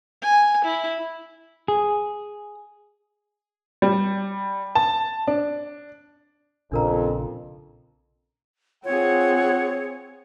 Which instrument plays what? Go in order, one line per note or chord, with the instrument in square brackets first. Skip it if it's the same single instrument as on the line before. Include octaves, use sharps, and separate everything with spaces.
[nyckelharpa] G#5
E4
[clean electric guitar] G#4
[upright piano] G3
A5
D4
[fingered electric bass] A#1 A#2 C#3 [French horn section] F2 [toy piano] D4 A#4 A#5
[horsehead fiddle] C4 G#4 [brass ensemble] F4 F#5 [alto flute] C#5